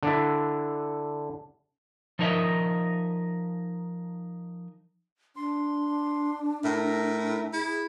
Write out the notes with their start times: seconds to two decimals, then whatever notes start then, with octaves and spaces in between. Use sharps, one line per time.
0.03 D3 D4 E4
2.19 F3 D#4 A#4 C#5 D#5 E5
5.36 D4 C6
6.64 A2 A#4 E5
7.53 E4 G#4